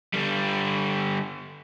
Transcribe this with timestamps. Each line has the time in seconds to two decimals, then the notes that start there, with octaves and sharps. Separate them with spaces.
0.13 D3 G3